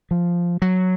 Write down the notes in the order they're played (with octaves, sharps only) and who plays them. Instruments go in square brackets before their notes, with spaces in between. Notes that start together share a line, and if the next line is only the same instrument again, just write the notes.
[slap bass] F3
F#3